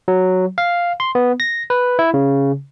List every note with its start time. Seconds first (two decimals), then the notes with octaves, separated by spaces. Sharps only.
0.08 F#3
0.58 F5
1.00 C6
1.15 B3
1.40 A#6
1.70 B4
1.99 E4
2.14 C#3